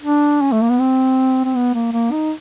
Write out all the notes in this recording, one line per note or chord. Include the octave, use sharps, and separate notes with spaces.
D4
C#4
A3
A#3
B3
C4
C4
B3
A#3
A#3
D#4